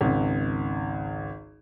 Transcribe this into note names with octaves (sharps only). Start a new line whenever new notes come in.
G#1 C#2